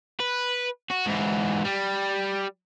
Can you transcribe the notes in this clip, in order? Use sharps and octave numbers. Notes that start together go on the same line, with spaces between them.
B4
F#4
G#2 E3
G3